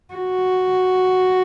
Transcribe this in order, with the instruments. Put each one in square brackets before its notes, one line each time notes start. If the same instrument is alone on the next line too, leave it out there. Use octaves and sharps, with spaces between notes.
[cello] F#4